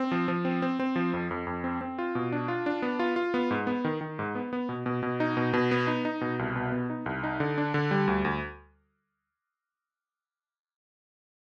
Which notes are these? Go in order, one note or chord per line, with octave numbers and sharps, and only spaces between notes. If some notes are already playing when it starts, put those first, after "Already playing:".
Already playing: C4
F3
F3
C4
C4
C4
F3
F2
F2
F2
C4
C4
F4
B2
D4
F4
D4
B3
F4
F4
B3
G#2
B3
D#3
D#3
G#2
B3
B3
B2
B2
B2
D#4
B2
B2
B3
D#4
D#4
B2
C2
B2
B3
D#4
C2
D#4
D3
D4
D3
G3
D2
D2